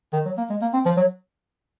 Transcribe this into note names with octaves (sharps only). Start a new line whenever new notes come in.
D#3
F#3
A#3
G#3
A#3
C4
F3
F#3